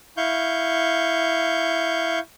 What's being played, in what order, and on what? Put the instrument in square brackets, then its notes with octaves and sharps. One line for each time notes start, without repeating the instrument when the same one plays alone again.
[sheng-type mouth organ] E4 F5 C#6 G6